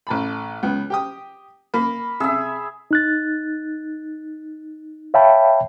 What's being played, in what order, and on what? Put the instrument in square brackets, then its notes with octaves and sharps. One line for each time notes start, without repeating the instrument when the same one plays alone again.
[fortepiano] A1 A5 B5
C#2 B3
G4 G5 D#6
[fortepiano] A#3 [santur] B5
[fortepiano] C3 E6 [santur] G#4 E5
[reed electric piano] D#4 F#6 A6
C#5 E5 F5 G5 A5 B5